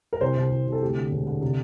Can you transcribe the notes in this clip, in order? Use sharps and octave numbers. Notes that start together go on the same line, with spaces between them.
A#4
C2 C5
C2
C2
C2
A4
D2 G4
D3
E1
D3
C3